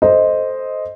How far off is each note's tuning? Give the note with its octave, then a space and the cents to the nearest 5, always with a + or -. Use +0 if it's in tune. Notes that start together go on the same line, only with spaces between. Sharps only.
A4 +0 C5 +0 D#5 +0